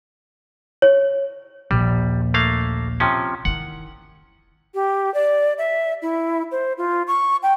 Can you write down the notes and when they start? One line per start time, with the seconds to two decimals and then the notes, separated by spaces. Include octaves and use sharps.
0.82 C#5
1.71 A#1 D#2 G3
2.34 A3 A#3 F5
3.00 C3 F3 C#4
3.45 D#3 E4 F#5
4.74 G4
5.14 D5
5.58 E5
6.02 E4
6.52 C5
6.78 F4
7.07 C#6
7.43 G5